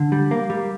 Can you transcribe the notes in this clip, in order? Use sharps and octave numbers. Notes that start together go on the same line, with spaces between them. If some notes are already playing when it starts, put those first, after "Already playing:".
Already playing: D3
G3
A#3
G3